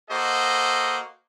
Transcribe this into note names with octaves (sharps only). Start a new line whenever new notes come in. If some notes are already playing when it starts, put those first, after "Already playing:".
A#3 F#4 A4 C5 D#5